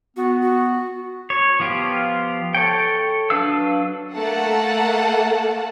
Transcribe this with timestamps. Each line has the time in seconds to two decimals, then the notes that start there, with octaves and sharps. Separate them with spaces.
0.17 B3 F#4
0.41 F#4
1.30 C#5
1.60 F3 B3 F4 G4
2.55 A4 C#5 G5
3.30 F#3 D4 B4 F5 E6
4.15 A3 A#3 A4 F#5 A5